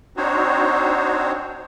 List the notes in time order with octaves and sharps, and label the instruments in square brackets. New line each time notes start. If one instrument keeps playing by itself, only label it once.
[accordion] C4 D4 D#4 F#4 C5 C#5